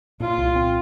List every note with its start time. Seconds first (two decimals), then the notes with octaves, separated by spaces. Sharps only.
0.20 A#2 F4
0.38 C2
0.55 C4